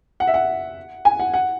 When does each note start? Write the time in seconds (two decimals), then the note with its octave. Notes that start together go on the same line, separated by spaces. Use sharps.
0.20 F#5
0.27 E5
0.34 F#5
1.05 G#5
1.19 F#5
1.34 F#5